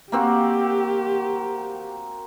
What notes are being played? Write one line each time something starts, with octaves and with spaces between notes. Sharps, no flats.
A#3 C4 F#4 G4